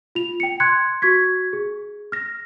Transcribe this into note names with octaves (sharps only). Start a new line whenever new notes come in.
F4 F7
G5 C#7
C6 F#6 G#6 C#7
F#4 C#6 G#6 B6
G#4
F6 A#6